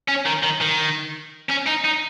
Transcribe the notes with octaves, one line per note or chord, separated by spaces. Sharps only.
C#4
D#3
D#3
D#3
C#4
D#4
D#4